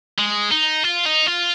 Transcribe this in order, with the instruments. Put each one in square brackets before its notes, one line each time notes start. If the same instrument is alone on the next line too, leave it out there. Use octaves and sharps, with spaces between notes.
[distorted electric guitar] G#3
D#4
F4
D#4
F4